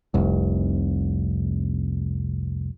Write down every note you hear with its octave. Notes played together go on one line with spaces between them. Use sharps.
F1 C2